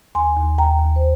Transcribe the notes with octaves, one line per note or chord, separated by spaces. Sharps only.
D#2 G#5 C6
D#2
D#2 G5 A#5
D#2
C5